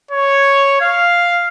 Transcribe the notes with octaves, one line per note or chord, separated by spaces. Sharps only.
C#5
F5